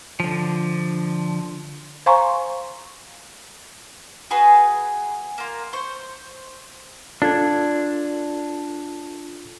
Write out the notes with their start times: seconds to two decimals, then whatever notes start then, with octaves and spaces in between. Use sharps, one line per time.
0.20 D3 F3
2.06 C5 F5 G#5 A#5 C6 C#6
4.31 F#4 G#4 B4 G#5
5.38 A#3 F4
5.73 C5 C#6
7.22 D4 F4 A4 G#6